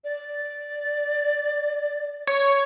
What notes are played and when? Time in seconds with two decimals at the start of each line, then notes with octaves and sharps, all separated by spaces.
0.04 D5
2.27 C#5